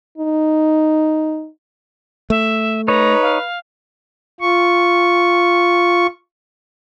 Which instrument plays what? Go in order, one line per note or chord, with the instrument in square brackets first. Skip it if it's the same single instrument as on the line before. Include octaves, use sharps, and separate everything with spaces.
[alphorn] D#4
[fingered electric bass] A3 [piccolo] E5
[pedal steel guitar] D#4 C#5 [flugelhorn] B4 [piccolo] A#5
[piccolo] F5
[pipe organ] F4 C#6